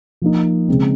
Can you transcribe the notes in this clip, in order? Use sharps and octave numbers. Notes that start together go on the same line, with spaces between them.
F3 A#3 D#4
C#3 G#3 C4